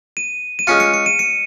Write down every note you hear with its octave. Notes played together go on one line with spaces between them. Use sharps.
D#7
D#7
G#3 C#4 F4 C#7
C#7
C#7
D#7
C#7